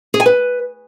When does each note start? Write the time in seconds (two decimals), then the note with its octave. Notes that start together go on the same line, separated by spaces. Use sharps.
0.14 G#4
0.20 G#5
0.26 B4